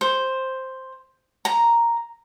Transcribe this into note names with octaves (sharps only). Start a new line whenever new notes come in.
C5
A#5